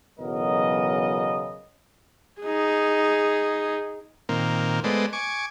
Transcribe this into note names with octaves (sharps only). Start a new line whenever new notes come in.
B1 E2 C#3 F#3 A#4 D#5
D#4 G#4
A#2 D#3 A#3 C4
G#3 A3 B3 C5 D5 D#5
G#5 C#6 D6